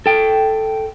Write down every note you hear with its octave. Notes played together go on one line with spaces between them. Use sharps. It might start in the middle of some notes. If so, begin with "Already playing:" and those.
A4 G5